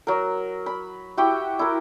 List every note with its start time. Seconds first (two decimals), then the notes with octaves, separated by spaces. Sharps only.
0.07 F#3 A#4
0.66 B5
1.17 E4 F#4 G4 G5
1.59 E4 A#4